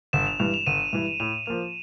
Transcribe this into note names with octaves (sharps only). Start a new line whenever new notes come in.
G1 E7
F7
G2 E3 F7
F7
G1 D#7
G2 E3
A2 F7
F3 A#3 F7